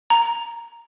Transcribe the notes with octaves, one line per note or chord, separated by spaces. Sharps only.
A#5